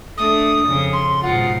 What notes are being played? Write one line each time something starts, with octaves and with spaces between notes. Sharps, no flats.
A3 D4 D#6
F2 C#3
C6
G#2 B2 F4 F#5